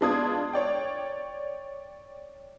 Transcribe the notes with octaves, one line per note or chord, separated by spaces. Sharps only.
G#3 B3 D4 F4 D#6 G#6
C#5 D5 G5